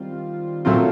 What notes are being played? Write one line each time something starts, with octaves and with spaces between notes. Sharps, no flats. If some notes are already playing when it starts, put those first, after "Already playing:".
Already playing: D#3 G3 C4 F4
A#2 F#3 A3 C4 F4